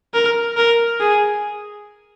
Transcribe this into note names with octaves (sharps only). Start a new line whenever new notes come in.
A#4
A#4
G#4